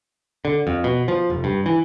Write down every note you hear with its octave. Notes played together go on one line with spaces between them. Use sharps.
D3
F2
B2
F3
F1
G2
E3